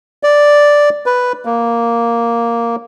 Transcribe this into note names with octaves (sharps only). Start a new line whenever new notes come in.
D5
B4
A#3